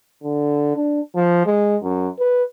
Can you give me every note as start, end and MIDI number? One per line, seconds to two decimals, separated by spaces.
0.23 0.76 50
0.76 1.00 62
1.15 1.44 53
1.46 1.77 56
1.83 2.08 42
2.19 2.44 71